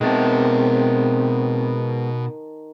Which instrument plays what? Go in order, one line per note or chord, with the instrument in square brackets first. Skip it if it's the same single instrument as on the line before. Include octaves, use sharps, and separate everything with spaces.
[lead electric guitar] B2 E5 [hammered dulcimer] D#3 A5 [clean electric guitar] G#3 B3 [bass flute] C4